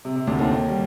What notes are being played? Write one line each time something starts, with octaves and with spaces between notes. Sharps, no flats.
C3
C3
D2 D3
D#2 D#3
D#2 D#3
G3